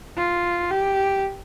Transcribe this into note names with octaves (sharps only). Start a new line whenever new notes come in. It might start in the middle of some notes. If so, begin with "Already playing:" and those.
F4
G4